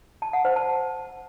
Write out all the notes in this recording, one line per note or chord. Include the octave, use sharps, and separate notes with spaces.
A5
F#5
C5
A5